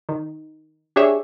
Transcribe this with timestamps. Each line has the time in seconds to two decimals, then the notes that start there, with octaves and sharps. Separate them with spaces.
0.09 D#3
0.96 D4 G4 G#4 C#5 E5